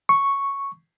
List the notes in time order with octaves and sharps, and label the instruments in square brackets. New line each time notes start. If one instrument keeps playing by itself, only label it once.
[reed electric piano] C#6